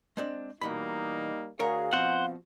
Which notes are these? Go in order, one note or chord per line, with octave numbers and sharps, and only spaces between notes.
G#3 C4 D4
B2 E3 G3 A#3 D#4 B5
D2 F#4 G#4 A#4 C#5 F5
B2 F3 B3 C4 F#4 C5 F#5